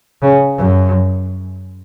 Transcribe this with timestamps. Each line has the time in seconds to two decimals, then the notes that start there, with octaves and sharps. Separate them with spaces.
0.22 C#3
0.58 F#2